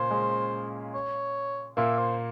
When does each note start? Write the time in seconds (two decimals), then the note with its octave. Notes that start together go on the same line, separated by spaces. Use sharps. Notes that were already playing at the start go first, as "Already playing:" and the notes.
Already playing: A#2 C#3 A#3 C#4 C5
0.11 G#3
0.94 C#5
1.77 A#2 A#3 E5
1.98 C5